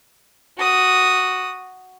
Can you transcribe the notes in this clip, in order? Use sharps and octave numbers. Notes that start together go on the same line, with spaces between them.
F#4 D#6